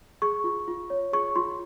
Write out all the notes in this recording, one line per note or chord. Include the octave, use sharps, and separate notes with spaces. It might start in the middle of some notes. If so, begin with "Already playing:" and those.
G#4 C#6
F4
F4
C#5
G#4 C#6
F4 C6